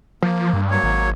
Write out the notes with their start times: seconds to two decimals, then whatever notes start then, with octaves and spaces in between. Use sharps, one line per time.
0.23 F3 A#3
0.53 G2
0.71 F#3 A#3 C#5
0.83 G#1